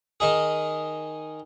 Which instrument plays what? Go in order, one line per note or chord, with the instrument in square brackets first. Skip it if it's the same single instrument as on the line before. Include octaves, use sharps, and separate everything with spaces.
[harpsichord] D#3 D#4 G#4